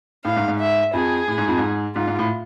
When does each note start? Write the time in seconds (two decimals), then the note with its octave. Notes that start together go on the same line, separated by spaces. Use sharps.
0.25 A2 F5
0.37 G#2
0.48 G#2
0.59 E5
0.93 F2 G#4
1.28 A2
1.38 G#2
1.48 F2
1.58 G#2
1.95 G#2 F4
2.08 G#2
2.19 A2